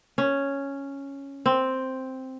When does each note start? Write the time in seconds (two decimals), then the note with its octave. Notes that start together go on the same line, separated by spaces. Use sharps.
0.18 C#4
1.46 C4